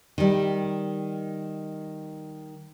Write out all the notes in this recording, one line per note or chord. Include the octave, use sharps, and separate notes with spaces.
D#3 G3